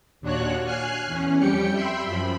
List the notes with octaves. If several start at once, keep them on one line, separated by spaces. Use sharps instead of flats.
D#2 A#2 D4 F#4 C#5 F#6
G#5 F6 F#6 C7
E2 C#4
F2 G3 G4 G5 C#7
E5 G5 B5 C6
F#2 F3 B5